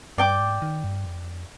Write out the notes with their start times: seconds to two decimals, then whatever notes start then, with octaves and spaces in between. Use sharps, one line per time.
0.18 G2 D5 G5 D6
0.39 G#2
0.62 D#3
0.84 G2
1.05 F2